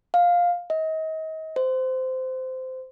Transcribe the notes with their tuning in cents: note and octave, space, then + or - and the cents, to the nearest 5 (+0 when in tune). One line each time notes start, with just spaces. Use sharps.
F5 +10
D#5 +35
C5 -15